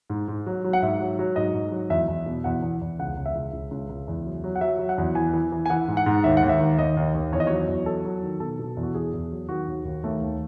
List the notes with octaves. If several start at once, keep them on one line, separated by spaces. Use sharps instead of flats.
G#2
G#2
F#3
F#3
F#5
G#2 E5
F#3
F#3
G#2 D#5
G#2
F#3
E2 E5
E2
B2
E2 F#5
E2
E2
C#2 F#5
C#2
E5
C#2
C#2
C#2
C#2
E2
F#3
F#3
F#5
F#3 E5
F#3
F#5
E2
E3 G#5
E3
E3
G#5
E3 F#5
G#2
F#5
G#2
D#2 E5
F#5
D#2
E5
D#3
D#2 D#5
D#2
D#2
E2 C#5
D#5
F#3 C#5
E2
F#3 A4
F#3
D#3
B2 A4
B2
E2
F#4
E2 G#4
E2
F#3
D#3 F#4
D#2
D#2
D#2 A3
D#2